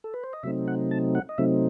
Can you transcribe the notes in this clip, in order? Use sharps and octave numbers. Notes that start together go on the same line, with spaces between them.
A4
B4
C5
D#5
C3 F#3 A3 C4 D#4 E5
F#5
A5
F#5
D#5
C3 F#3 A3 C4 D#4 E5